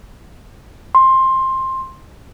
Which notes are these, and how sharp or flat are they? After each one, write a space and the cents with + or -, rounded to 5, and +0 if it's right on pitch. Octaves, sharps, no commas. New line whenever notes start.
C6 +15